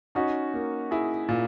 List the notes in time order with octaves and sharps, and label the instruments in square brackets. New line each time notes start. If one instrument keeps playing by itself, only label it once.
[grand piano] C#4 [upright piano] D#4 F#4
[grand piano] A#3
[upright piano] E4 [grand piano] G#4
[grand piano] A#2